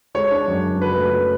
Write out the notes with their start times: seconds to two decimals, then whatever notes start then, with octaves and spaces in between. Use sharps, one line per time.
0.15 G#3 C#5
0.31 D4
0.48 F#2
0.65 C#3
0.82 F#3 B4
0.97 A3